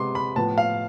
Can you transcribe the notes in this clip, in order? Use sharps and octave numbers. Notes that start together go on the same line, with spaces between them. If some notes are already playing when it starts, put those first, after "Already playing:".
Already playing: C3 G#3 B3 C6 D6
B5
A2 F3 B3 A5
F5